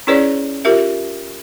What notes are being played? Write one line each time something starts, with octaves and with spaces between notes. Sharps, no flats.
C#4 E4 G#4 B4 C#5 D5
F4 G4 A#4 E5